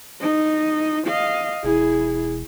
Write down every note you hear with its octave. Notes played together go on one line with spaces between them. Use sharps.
D#4 D#5
D#5 F5
E1 E4 G#4